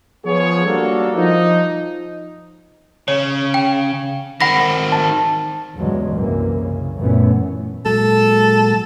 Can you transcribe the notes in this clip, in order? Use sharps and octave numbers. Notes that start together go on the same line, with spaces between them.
F3 B3 G#4 C#5
G3 A#3 D4 F#4 A4
F3 D#4
C#3 C#5
G5
D#3 C4 F#5 B5 A#6
A5
E2 G2 C#3 F#3 G#3
C2 F#2 E3 A#3
C#3
F#2 A#2 E3 A3 B3 C#4
A#2 F#3 G#3 A4